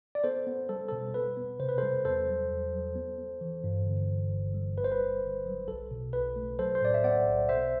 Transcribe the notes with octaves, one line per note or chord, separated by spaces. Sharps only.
D5
B3 A4 C5
B3
G3 A4
B2 A4
B3 B4
B3
C3 C5
B4
G3 A4 C5
E2 A4 C5
F#3
E2
F#3
B3
B3
E3
G2
D3
G1
G1
G3
G1 B4
C5
B4
G1
G1
F#3
B1 A4
B2
B1 B4
A3
F#3 A4 C5
C5
A2 D5
E5
B3 D5 F#5
B1
B2 C5 E5